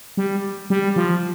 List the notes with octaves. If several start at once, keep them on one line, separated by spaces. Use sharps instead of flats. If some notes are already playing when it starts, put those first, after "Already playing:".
G3
G3
F3